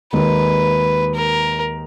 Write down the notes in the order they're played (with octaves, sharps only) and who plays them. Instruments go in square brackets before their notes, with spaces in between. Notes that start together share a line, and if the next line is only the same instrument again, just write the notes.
[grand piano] D#2 D#3 G#3 D#4 [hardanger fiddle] B4
[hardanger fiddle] A#4